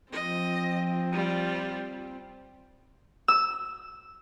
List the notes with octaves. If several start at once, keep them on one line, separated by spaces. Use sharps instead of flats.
F3 C4 D#5
G3 F4
E6